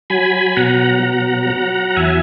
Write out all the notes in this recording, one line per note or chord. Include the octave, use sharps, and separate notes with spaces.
F#3 G#5 B5
B2 F#5 A#5
F#3
F#3
E2 E5 G#5